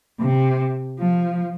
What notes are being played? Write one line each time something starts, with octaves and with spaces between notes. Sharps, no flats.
C3
F3